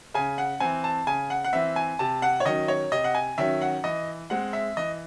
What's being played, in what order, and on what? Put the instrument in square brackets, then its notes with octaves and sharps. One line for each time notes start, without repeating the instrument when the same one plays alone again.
[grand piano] C#3 G#5
F#5
E3 C4 G#5
A5
C#3 G#5
F#5
F#5
E3 C4 E5
G#5
C3 A5
F#5
C#5
D#3 F#3 C#4 D#5
C#5
C3 D#5
F#5
G#5
D#3 F#3 C#4 E5
F#5
E3 D#5
G#3 C4 F#5
E5
E3 D#5